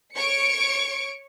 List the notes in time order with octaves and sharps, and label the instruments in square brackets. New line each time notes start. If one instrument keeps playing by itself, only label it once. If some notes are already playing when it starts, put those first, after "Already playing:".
[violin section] C#5 C#6 C#7 D7